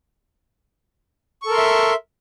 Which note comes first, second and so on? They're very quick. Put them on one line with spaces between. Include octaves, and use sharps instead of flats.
C#6 A4 A#4 C6 E5